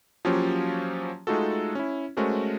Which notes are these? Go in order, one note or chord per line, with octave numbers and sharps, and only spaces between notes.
F3 F#3 A#3 C#4 F4 G4
G#3 A3 D#4 F4 F#4 A4
C#4 E4
G#3 A3 C#4 F#4 A#4 C5